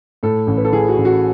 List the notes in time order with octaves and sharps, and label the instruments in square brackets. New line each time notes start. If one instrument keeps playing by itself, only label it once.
[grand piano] A2 A4
A1
B4
A4
E3 G#4
F#4
A1
F#4